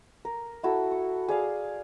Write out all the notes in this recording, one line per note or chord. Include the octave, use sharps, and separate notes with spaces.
A#4
E4 F#4 A4
C#6
G#4 D5 F5